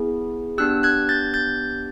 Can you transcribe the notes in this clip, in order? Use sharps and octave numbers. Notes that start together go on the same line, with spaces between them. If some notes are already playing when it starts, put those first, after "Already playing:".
Already playing: B3 E4 G#4
B3 D4 G4 E6 F#6
F#6 G#6
G6 A6
G6 A6